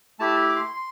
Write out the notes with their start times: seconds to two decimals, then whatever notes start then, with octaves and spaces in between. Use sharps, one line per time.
0.19 A3 E4 G4 A5
0.49 D6
0.56 C6
0.74 C6